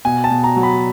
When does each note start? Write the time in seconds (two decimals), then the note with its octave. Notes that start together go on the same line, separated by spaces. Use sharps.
0.05 B2 G#5
0.24 A5
0.30 B2
0.44 A#5
0.56 F#3
0.63 B5